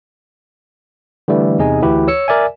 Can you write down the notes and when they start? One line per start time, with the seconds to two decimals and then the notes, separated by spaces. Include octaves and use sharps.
1.28 D3 E3 G3 A3
1.59 E2 C3 D#4 G#4 D#5 G#5
1.82 D2 E3 E4 F#4 G4 B4
2.08 C#5 E6 C#7
2.28 A#4 D5 E5 G#5